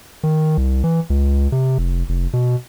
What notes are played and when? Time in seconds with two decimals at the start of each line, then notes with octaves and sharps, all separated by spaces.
0.23 D#3
0.57 C2
0.84 E3
1.10 C#2
1.52 C3
1.78 F1
2.09 F1
2.33 B2